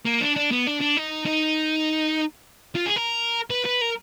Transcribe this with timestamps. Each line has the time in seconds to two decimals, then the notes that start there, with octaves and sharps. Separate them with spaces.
0.06 A#3
0.21 D4
0.36 D4
0.51 B3
0.67 D4
0.80 D4
0.97 D#4
1.25 D#4
2.75 F4
2.86 G#4
2.96 A#4
3.50 B4
3.65 B4
3.81 A#4